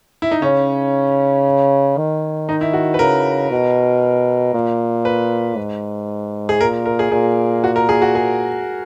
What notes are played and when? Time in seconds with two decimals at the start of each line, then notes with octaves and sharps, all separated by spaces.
0.22 E4
0.31 D#4
0.42 C#3 C#4
1.97 D#3
2.49 D#4
2.61 E4
2.73 F#4
2.94 B4
2.99 C#3 A#4
3.51 B2
4.54 A#2
5.05 B4
5.57 G#2
6.49 G#4
6.60 A#2 A#4
6.86 A#4
6.99 G#4
7.12 A#2 G#4
7.64 F#4
7.76 A#4
7.89 G#4
8.02 F#4
8.15 G#4